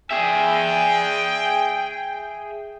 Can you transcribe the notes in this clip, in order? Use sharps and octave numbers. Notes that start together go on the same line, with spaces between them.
G#4 E5 G5